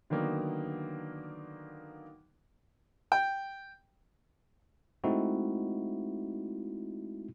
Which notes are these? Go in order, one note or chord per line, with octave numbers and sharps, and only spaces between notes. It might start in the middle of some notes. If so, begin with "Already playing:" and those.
D3 D#3 F#3 A#3 B3
G5
G#3 A3 C4 D#4 E4 F#4